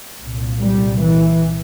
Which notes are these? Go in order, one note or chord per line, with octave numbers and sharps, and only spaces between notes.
C2 A#2
G3
E3